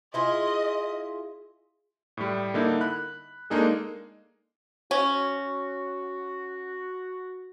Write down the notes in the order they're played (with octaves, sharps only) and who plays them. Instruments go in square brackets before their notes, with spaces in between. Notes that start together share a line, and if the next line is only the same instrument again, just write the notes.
[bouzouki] E4 F4 G#4 [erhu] D#5
[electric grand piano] A2 G3
D3 A#3 D#4 E4
B5 F#6
G#3 A#3 D4 D#4 G#4 A4
[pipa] C#4 [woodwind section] F#4